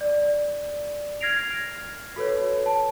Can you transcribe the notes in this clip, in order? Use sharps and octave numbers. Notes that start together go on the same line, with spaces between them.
D5
F6 G#6 A#6 C7 D7 F7
F#4 A4 B4 C#5
A5